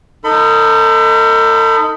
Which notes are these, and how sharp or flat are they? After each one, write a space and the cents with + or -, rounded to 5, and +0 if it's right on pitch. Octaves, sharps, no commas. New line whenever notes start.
D#4 +5 A4 +40 B5 +30